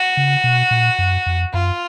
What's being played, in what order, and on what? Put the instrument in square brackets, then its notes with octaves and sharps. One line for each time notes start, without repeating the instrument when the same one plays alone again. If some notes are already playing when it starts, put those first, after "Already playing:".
Already playing: [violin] F#4
[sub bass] C#3
B2
A#2
F#2
F2
[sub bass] F#2 [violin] F4